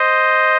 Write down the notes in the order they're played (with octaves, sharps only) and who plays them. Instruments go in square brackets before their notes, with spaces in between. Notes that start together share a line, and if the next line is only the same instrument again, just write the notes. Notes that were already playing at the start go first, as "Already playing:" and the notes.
Already playing: [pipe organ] C5 D#5